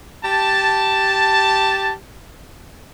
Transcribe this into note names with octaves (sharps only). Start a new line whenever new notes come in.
G4 A5